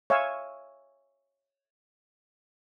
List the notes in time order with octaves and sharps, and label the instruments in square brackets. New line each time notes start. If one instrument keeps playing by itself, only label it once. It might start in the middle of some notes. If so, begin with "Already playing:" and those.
[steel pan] C#5 E5 F5 G#5 E6